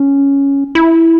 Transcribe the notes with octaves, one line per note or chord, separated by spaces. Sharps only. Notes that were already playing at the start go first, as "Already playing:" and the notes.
Already playing: C#4
E4